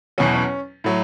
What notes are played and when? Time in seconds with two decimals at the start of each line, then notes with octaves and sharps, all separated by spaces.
0.18 E2 B2 F#3 C#4
0.34 C#4
0.84 A2 F#3